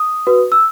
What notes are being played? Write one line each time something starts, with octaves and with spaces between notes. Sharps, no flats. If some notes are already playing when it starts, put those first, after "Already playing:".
Already playing: D#6
F#4 B4
E6